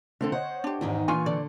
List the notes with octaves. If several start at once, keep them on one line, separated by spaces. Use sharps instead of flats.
D3 A3 C4 A4
C5 C#5 D#5 F#5
D4 G4
E2 G#2 D#3 D#4
A#2 E3 D4 F4 G#5 C#6
D3 D5